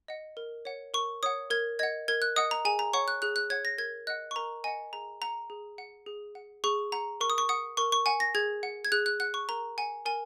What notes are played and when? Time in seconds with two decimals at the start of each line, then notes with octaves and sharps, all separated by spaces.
0.08 D#5 F#5
0.37 A#4
0.65 C#5 F#5
0.94 A#4 C#6
1.23 C#5 F#5 D#6
1.50 A#4 G#6
1.79 D#5 F#5 G#6
2.08 A#4 G#6
2.22 F#6
2.36 D#5 F#5 D#6
2.51 A#5
2.65 G#4 G#5
2.79 A#5
2.93 C#5 F#5 C#6
3.08 F#6
3.22 G#4 F#6
3.36 F#6
3.50 C#5 F#5 G#6
3.65 A#6
3.78 A#4 G#6
4.07 D#5 F#5 F#6
4.31 C#6
4.36 A#4 A#5
4.64 D#5 F#5 G#5
4.93 G#4 A#5
5.22 F#5 A#5
5.50 G#4
5.78 F#5
6.06 G#4
6.35 F#5
6.64 G#4 C#6
6.92 F#5 A#5
7.21 A#4 C#6
7.30 D#6
7.38 C#6
7.49 F#5 D#6
7.77 A#4 C#6
7.92 C#6
8.06 F#5 G#5
8.20 A#6
8.35 G#4 G#6
8.63 F#5
8.85 G#6
8.92 G#4 F#6
9.06 F#6
9.20 F#5 F#6
9.34 C#6
9.49 A#4 A#5
9.78 F#5 G#5
10.05 A#4 G#5